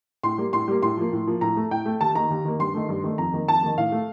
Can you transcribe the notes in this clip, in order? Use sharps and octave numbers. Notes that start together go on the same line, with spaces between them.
A2 C6
G3 A#3
A2 C6
G3 A#3
A2 C6
F3 A#3
A2
F3 A#3
A2 A#5
A3
A2 G5
A3
D#2 A5
D#3 A#3 A#5
D#2
D#3 A#3
G2 C6
D#3 A3
G2
D#3 A3
F2 A#5
D#3 A#3
F2 A5
D#3 A#3
A2 F5
A3